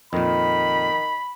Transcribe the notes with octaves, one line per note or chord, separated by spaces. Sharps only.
F2 A#2 D#3 B5